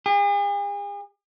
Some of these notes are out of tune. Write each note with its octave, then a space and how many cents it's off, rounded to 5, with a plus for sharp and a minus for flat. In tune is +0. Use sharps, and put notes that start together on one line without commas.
G#4 -45